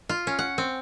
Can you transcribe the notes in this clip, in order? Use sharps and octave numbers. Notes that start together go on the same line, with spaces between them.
F4
C#4
F#5
C4